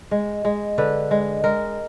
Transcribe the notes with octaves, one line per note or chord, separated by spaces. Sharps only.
G#3
G#3
D3 B4
G#3
G#3 A#4